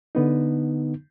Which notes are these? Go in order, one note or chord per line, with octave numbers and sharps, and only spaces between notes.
D3 B3 D#4